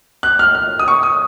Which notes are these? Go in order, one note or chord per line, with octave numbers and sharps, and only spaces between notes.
F#6
F6
F6
D#6
C#6
D#6